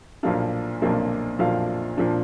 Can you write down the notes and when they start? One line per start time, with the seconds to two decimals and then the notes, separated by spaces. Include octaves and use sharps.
0.23 B1 A#2 F3 A#3 D4 F5
0.82 B1 A#2 F3 A#3 D4
1.39 B1 A#2 F3 A#3 D4 F5
1.98 A#2 F3 A#3 D4